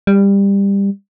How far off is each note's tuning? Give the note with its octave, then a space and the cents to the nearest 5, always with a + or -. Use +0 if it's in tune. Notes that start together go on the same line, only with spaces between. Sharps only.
G3 +20